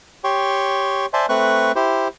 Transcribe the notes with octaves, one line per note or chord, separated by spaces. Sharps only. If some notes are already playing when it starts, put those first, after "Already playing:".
G4 C#5 G5 C6 C#6
C5 D5 E5 G#5 A5 C6
A3 C4 B4 C#6 F#6
E4 G4 C5